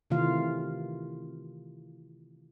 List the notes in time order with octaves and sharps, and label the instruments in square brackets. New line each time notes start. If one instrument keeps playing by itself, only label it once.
[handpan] C3 D#3 E3 A3 F4 F5